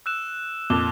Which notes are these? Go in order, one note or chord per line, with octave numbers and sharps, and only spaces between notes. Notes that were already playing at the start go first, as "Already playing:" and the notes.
E6 F#6 E7
F2 A#2 D6 E7 G7